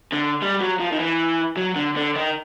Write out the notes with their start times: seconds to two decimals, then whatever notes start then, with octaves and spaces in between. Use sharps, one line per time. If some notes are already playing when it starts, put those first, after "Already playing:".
0.12 D3
0.42 G3
0.61 F#3
0.80 F3
0.92 D#3
0.99 E3
1.57 F#3
1.76 D3
1.96 D3
2.16 D#3